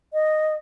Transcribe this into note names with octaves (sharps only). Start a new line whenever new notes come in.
D#5